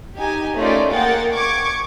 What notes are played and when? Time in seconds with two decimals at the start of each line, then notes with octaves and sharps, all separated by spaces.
0.17 D#4 G4 G#5
0.57 A3 C#4 D#4 F4 A#4 D5
0.91 A#3 G#4 A#4 F#5 G5 A6
1.32 C#6 D6 G#6